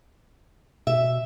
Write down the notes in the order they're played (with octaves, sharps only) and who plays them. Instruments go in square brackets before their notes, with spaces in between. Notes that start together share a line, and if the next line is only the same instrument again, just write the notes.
[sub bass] B2 [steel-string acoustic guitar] E5